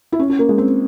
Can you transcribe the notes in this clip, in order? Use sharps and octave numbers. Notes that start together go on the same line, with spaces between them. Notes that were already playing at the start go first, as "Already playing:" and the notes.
E4
C#4
C#4
A#3
G#3
C4